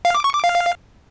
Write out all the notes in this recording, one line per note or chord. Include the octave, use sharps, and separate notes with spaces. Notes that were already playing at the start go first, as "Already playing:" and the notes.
F5
D6
C#6
D6
F5